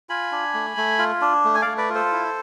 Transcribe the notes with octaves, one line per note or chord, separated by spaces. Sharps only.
F4 G#5 B5
D4
A3
A3
F4
D4
A3
G#5
A3 D5 F5
B4 D5
F4
A4 C5
E4